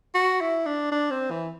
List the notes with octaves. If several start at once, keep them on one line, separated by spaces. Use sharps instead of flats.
F#4
E4
D4
D4
C4
E3